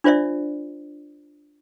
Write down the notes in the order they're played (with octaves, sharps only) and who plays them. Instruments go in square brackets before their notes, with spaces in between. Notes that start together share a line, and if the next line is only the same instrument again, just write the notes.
[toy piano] D4 F4 C5 D5 E5